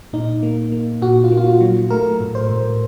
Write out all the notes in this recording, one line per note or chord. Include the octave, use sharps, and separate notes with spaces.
A#2 D#4
A#3
A#3
A#2 F#4
F4
A#3
F4
F#4
F#3
A3 A#4
A2
C5
A2